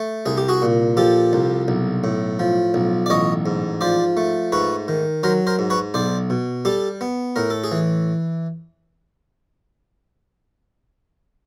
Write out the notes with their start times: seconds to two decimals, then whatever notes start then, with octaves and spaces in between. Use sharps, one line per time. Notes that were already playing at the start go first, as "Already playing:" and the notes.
Already playing: A3
0.26 C2 G#4
0.37 G4
0.48 F#4 G#4
0.62 A#2
0.97 F3 G4 A4
1.33 C2
1.68 B1
2.04 A2
2.39 F3
2.74 B1
3.06 D5
3.10 A1 C#5 D#5
3.46 G#2
3.81 F3 C5 D5
4.17 A3
4.52 G#2 B4 C#5
4.88 D#3
5.23 F#3 A#4 C5
5.47 A#4 C5
5.59 G#2
5.70 B4 C#5
5.94 B1 C5 D5
6.30 B2
6.65 G3 G4 A4
7.01 B3
7.36 A2 A#4
7.50 A4
7.64 G#4
7.72 E3